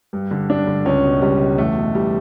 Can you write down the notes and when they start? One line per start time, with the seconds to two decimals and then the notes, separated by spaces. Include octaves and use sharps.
0.13 G2
0.31 D3
0.50 G2 D4
0.67 D3
0.85 C#2 C#4
1.04 B2
1.22 C#2 G3
1.40 B2
1.58 E2 A3
1.76 B2
1.94 E2 G3